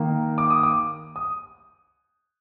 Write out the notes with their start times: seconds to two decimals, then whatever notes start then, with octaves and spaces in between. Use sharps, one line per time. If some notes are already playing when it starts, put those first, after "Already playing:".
Already playing: D#3 A#3
0.38 D6
0.50 D#6
0.63 D6
1.16 D#6